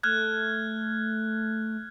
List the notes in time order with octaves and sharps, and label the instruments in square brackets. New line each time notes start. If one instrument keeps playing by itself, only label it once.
[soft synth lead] A3 [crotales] F6 F#6 G#6